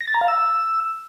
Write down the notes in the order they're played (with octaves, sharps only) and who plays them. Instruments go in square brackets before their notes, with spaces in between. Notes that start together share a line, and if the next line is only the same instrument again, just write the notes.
[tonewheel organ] A#6
A6
A#5
F5
E6